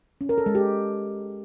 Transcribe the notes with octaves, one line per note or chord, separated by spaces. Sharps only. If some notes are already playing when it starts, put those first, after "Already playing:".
C#4
A#4
A4
G#3
G4